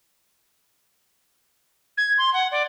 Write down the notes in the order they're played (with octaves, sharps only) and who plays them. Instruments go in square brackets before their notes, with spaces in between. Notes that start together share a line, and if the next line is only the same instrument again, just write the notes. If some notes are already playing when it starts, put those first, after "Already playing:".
[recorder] G#6
C6
F#5
D5